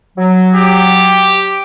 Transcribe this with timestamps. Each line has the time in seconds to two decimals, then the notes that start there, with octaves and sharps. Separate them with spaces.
0.17 F#3
0.55 G4